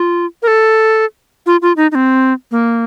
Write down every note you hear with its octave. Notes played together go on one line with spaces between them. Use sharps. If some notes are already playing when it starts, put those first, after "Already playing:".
Already playing: F4
A#4
A4
F4
F4
D#4
D#4
C4
A#3